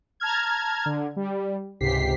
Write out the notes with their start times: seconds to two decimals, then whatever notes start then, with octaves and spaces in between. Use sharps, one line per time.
0.20 A5 A#5 F6 G#6
0.86 D3
1.17 G3
1.81 C#2 G#2 C3 G4 B6 C7